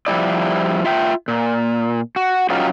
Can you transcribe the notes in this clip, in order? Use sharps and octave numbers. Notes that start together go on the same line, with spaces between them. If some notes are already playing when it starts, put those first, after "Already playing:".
F3 G3 E4 D5
F4 E5 G5
A#2
F#4
F#3 C#4 D#4 F4 G4